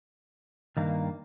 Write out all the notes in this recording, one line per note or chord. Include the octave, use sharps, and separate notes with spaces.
G2 D#3 A#3